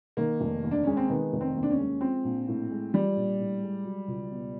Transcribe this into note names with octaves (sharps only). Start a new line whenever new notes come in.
D#3 A#3
F1
D#2
D4
G#3 C#4
C4
D#3 B3
F1
C4
D#2
D4
C#4
G#3
F3 C4
A#1
A2
G#3
F3 G3
A#1
A2
G#3
F#3
C#2
B2